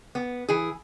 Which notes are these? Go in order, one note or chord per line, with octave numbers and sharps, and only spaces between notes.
B3
E3 G#4